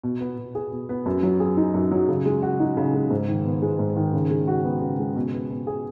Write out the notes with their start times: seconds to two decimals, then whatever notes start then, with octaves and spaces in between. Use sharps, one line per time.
0.03 B2
0.21 B3
0.38 B2
0.55 G#4
0.72 B2
0.89 B3
1.06 F#2
1.23 F#3
1.40 G#4
1.57 D#4
1.74 F#2
1.91 F#3
2.09 C#3
2.26 G#3
2.42 F#4
2.60 D#4
2.77 C#3
2.94 G#3
3.10 G#2
3.28 D#3
3.45 B3
3.62 G#3
3.79 G#2
3.96 D#3
4.13 C#3
4.31 G#3
4.48 F#4
4.65 B3
4.81 C#3
4.99 G#3
5.16 B2
5.33 B3
5.50 B2
5.67 G#4